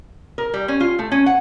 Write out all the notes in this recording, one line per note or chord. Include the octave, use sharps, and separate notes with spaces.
A#4
G3
C#4
F4
A3
C#4
F#5